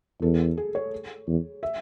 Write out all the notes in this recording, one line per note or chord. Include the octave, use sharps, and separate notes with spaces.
E2 A4
G#4
C#5
E2
E5